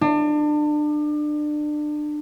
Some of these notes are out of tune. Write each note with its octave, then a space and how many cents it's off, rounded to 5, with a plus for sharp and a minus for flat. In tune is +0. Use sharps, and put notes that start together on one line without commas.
D4 +30